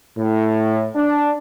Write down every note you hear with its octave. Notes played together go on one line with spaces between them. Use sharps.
A2
D4